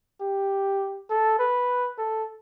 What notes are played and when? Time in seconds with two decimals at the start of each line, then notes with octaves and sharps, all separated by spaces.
0.21 G4
1.10 A4
1.39 B4
1.98 A4